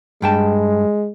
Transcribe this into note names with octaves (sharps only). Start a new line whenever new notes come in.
G2 G#3 G5 A5